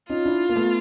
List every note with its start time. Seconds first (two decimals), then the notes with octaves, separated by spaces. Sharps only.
0.09 C#4 D#4 F4
0.25 D4 E4
0.49 A#3
0.56 A3 B3